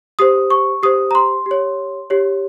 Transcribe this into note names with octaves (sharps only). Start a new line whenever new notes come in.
G4 C5 D#6
C#6
G4 C5 D#6
A#5
C6
G4
C#5
G4 C#5